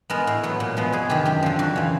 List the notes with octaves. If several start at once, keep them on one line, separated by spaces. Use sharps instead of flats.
G#3 B3 A#4
A2
F#3 B3
A#2
F3 G#3 B3
F2 G#4
C3 D#3 G4
F#2 G4
D3 F3
F2 F#4
C#3 E3